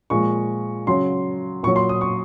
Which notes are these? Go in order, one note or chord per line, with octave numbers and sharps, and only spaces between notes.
A#2 F3 G#3 C#6
C#3 F#3 C6
A#2 F#3 C#6
C6
D#6
C#6